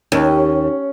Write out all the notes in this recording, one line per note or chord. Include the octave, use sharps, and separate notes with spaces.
D#2 C#4